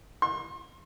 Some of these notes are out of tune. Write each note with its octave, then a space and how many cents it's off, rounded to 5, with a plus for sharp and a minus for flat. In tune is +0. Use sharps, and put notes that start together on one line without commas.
C6 +45